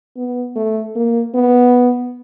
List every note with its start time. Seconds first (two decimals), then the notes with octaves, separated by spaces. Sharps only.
0.17 B3
0.56 A3
0.96 A#3
1.35 B3